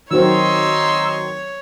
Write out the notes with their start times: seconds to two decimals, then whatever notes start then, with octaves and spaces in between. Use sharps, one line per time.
0.11 D#3 F#3 C4 D#4 C#5 C6 E6